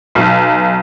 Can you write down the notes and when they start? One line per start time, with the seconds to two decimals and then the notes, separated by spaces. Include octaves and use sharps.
0.15 B1